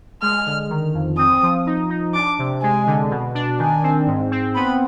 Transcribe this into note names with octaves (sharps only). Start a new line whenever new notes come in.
G#3 F6
D3
D#3
F2
C4 D#6
F3
D#4
D#4
D4 D6
C3
G#3 G#5
D3
B2
D4
D#3 G#5
C4
G#2
C4
B3 B5